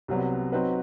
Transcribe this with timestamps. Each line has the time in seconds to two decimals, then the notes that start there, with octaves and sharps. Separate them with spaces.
0.08 C2 C3 F#3 B3
0.52 F#3 C4 D#4 F#4 B4